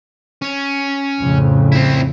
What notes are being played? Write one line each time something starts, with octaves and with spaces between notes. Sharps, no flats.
C#4
F2 A2 C#3
C4 E4